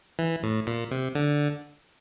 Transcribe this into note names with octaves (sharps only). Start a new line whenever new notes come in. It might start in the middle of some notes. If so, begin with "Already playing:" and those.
E3
A2
A#2
C3
D3